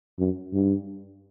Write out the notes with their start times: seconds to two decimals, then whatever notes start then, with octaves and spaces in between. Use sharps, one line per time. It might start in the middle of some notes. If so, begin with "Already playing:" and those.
0.18 F#2
0.53 G2